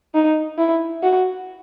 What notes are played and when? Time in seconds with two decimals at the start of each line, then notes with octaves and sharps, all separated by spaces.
0.14 D#4
0.58 E4
1.03 F#4